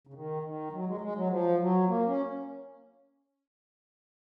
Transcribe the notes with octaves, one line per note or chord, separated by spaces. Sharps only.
C#3
D#3
D#3
F#3
G#3
G#3
F#3
F3
F#3
A#3
C#4